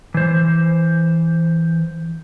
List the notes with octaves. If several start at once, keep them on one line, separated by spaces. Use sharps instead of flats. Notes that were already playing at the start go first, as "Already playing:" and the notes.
E3 C5